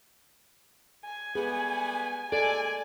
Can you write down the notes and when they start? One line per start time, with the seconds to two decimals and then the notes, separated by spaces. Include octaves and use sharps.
1.05 G#5
1.35 G3 A3 B3 G#4
2.32 D#2 G#3 A4 D5 G#5